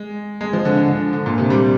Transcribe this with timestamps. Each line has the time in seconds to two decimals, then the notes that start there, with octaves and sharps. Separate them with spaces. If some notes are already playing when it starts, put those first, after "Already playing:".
Already playing: G#3
0.41 G#3
0.53 F3
0.65 D3
0.77 D3
1.13 D3
1.26 A#2
1.38 C3
1.50 G3